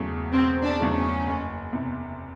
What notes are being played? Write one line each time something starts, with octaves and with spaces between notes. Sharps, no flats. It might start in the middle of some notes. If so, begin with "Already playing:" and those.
Already playing: E1 E2 C#3 F#3 A3
E1 C4
D4
E2 C#3 F#3 A3
C#4
F#1
E2 C3